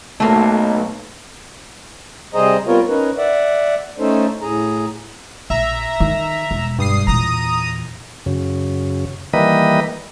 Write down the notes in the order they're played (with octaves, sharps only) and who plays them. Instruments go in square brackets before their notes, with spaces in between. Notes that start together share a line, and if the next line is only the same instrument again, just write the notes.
[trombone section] B1 [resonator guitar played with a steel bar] A3 A#3
[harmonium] C3 G3 G#4 C5 D#5 A#5
G3 B3 C4 F4 A#4 C#5
C#4 D#4 A#4 B4
D5 E5 F#5
A3 C#4 D#4 A4 C5
A2 G#4 A#5
[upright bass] A#1 [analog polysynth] E5 A#5
[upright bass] D#3
E1
[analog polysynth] G2 D#6 C7
[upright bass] E2 A#2 [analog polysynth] A#5 D#6
[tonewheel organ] F#2 C#3
D#3 E3 G3 A#3 B4 D#5